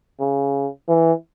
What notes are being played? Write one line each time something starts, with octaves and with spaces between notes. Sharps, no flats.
C#3
E3